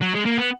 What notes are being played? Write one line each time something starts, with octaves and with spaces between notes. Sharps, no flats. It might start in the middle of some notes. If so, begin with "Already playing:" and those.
F#3
G#3
A#3
B3